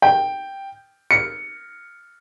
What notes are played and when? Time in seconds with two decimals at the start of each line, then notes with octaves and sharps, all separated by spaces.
0.02 G5
1.11 C#7